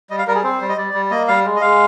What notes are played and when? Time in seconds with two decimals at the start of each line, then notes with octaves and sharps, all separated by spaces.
0.10 G3 D#5
0.18 F5
0.27 G3 A#4
0.35 G#4
0.44 C4 C5
0.61 G3
0.69 D#5
0.78 G3 D5
0.94 G3
1.11 A#3 D#5
1.28 G3 F5
1.45 G#3
1.56 D#5
1.61 G#3 F5